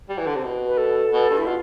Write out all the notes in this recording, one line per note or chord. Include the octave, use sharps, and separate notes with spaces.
G3
E3
D3
C3
B2
B4
A4
B2
G2
E4
B2 F4